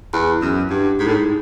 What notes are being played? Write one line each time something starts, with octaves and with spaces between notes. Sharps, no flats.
E2
F#2
G2
G#2
A2
G#2